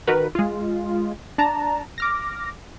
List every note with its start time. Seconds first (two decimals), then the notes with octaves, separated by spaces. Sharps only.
0.07 D#3 F#4 A#4 B4
0.35 G#3 F4
1.38 D4 A5 A#5
1.98 D6 F6 A#6